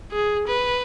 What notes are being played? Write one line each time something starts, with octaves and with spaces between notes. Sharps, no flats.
G#4
B4